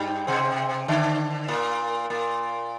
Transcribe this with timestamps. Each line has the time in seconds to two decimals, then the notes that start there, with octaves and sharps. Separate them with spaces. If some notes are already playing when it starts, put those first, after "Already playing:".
Already playing: G2 G3
0.27 C3 C4
0.88 D3 D4
1.48 A#2 A#3
2.10 A#2 A#3